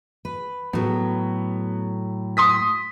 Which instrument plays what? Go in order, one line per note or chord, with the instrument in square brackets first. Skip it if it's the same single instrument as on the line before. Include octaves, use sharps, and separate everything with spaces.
[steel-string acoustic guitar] B4
[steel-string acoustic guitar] A2 F#3 [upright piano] B3
[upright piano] C6 D#6 B6